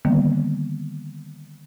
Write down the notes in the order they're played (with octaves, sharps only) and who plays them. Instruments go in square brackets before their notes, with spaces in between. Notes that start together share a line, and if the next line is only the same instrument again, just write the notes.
[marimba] D3 D#3 G3 A#3 B3